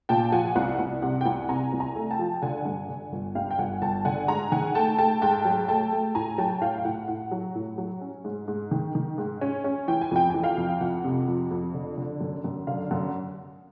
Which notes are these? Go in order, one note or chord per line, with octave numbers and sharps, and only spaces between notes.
A#2 G5 A5
F3 F#5 G#5
C2 F#5
C2
C3 F#5
G5
C2 F#5 G#5
C3 G#5 A#5
C2
G#5 A#5
A3
G5 A5
F3
D3 F#5 G#5
G2
D3
G1
G2 F5 G5
G5
G1 F#5 G#5
G1 G5 A5
D3 F#5 G#5
G#2 G#5 A#5
D#3 F#5 G#5
A3 G5 A5
A3 G5 A5
G#2 G5 A5
F#3
A3 G5 A5
A3
A2 G#5 A#5
F#3 G5 A5
A2 F5 G5
F5
A2 F#5
A2 F#5
F#3
A2
F#3
C#4
G#2
G#2
D#3
D#3
G#2
C#4
C#4
E3 G5
G#5
F2 G5
E3 G#5
F5 G5
F2
F2 F#5
C3
F2
F2
D3
D3
F#2
F#2
D3 F5
F#2 F#5